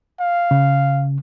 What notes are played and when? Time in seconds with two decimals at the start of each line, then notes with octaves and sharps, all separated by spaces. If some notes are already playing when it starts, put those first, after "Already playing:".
0.20 F5
0.51 C#3